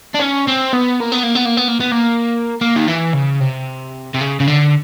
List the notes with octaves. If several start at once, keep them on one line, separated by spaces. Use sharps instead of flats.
D4
C#4
C4
B3
A#3
B3
A#3
B3
A#3
B3
A#3
B3
A#3
A#3
D#3
E3
C#3
C3
C3
C#3
C#3
D3